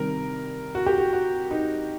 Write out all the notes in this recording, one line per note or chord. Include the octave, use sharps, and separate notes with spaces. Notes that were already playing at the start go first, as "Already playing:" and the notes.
Already playing: C3 D#3 G3 A#4
F#4
G4
F#4
F#4
D#4